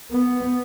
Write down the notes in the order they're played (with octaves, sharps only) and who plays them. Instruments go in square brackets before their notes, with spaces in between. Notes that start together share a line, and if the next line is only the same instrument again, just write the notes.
[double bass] B3